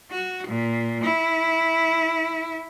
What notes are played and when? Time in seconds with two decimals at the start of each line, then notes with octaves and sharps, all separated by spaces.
0.11 F#4
0.46 A#2
1.03 E4